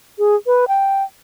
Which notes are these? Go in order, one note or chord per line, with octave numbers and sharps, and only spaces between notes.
G#4
B4
G5